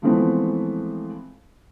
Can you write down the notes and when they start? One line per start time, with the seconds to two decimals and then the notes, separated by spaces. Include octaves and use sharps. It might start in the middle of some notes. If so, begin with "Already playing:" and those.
0.02 E3 F3 G#3 A3 B3 C4